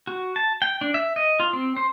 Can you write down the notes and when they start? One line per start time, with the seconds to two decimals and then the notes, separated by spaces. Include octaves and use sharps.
0.07 F#4
0.36 A5
0.62 G5
0.81 D4
0.94 E5
1.16 D#5
1.40 F4
1.53 C4
1.77 C5